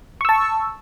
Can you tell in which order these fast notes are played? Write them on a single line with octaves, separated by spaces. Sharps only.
C#6 E6 A5